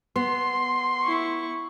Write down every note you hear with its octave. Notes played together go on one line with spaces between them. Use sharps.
B3 C6
E4 C#6